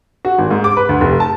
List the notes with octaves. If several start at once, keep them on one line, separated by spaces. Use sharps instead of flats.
F#4
G#1
G#2
D6
B4
D2
F1
A5